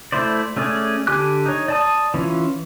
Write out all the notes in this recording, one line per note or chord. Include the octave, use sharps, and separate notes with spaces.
A3 E4 C5 D5
A3 C#4 G#4 D5
D3 G4 G#5 D6 F#6
D#4 C#5
D5 A5 D#6
E3 C#4 F4